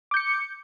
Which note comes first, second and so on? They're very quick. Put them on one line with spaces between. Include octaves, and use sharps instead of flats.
D6 G6 C#7